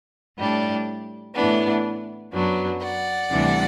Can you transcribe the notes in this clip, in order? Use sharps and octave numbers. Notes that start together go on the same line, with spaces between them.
A2 G3 D4
A2 E3 B3 D4
F#2 F#3 B3 D4
D5 F#5
D2 C3 E3 G3 D4